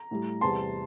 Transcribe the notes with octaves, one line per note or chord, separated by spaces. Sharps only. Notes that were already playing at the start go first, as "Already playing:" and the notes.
Already playing: A#5
A2 G3
E2 C3 G3 A5 C6